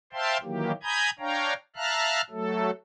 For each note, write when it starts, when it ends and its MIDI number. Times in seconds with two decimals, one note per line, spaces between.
0.13 0.37 72
0.13 0.37 76
0.13 0.37 77
0.13 0.37 79
0.13 0.37 81
0.13 0.37 84
0.43 0.72 51
0.43 0.72 52
0.43 0.72 54
0.43 0.72 58
0.43 0.72 67
0.83 1.10 80
0.83 1.10 82
0.83 1.10 83
0.83 1.10 87
0.83 1.10 91
0.83 1.10 92
1.19 1.53 62
1.19 1.53 73
1.19 1.53 77
1.19 1.53 79
1.19 1.53 82
1.76 2.21 76
1.76 2.21 77
1.76 2.21 81
1.76 2.21 82
1.76 2.21 89
1.76 2.21 90
2.30 2.71 54
2.30 2.71 57
2.30 2.71 69